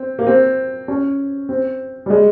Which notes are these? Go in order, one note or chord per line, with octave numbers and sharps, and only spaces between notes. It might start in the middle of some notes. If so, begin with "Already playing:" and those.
Already playing: C4
A#3
C4
C#4
C4
G3
G#3